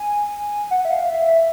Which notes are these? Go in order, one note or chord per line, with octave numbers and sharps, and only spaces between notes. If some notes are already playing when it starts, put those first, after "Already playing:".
Already playing: G#5
F#5
E5
F5
E5